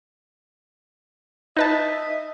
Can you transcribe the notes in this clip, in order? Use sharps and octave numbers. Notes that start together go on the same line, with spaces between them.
D#4 B4 D#5 E5 A5